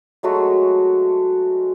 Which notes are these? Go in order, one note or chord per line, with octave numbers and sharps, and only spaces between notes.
F#3 G#3 A3 F#4